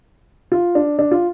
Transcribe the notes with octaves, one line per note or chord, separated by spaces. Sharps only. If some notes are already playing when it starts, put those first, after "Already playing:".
F4
D4
D4
F4